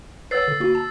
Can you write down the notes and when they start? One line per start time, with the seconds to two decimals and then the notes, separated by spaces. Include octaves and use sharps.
0.31 B4 C#5 F#5 E6 A6 C7
0.48 D3
0.60 A#3 F#4
0.75 A5